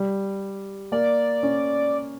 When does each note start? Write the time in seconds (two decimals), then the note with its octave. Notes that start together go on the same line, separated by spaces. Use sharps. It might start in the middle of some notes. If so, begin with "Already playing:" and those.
Already playing: G3
0.92 A#3 D5
1.43 C#4